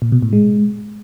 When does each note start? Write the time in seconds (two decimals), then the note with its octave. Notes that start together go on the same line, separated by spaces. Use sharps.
0.02 A#2
0.12 B2
0.22 A2
0.33 G#3